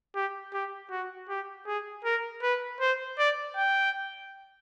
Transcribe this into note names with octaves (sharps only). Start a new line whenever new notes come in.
G4
G4
F#4
G4
G#4
A#4
B4
C5
D5
G5